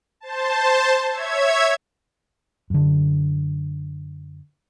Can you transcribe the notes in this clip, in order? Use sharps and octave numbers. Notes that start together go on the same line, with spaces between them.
C5 A5
C#5 E5 G#6
F#2 D3